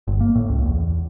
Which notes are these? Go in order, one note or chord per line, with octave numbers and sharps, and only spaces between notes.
G1
A#3
A2
C#2
E2